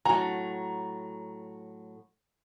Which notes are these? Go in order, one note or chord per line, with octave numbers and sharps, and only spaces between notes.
A2 F#3 A#5